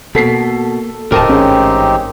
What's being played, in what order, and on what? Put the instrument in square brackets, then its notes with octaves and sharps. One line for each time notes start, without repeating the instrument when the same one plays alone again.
[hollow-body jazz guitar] B2 [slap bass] A#3 [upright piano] A4 B6 C7
[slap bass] D1 A2 [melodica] C4 D#4 G4 [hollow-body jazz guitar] A#4 D#5 A5
[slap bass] A1 G#2 [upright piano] C#4 G#4